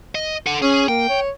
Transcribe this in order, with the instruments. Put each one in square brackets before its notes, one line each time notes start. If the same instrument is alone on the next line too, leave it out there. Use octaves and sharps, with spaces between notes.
[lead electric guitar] D#5
A4 F#5
[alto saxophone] C#4 [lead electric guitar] G#4
[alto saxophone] A#3 [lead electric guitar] G5
[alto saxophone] C#5